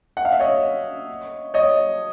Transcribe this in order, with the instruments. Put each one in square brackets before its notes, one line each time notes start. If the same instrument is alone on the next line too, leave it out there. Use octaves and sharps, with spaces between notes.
[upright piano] F#5
F5
E5
C#5 D#5
C#5 D#5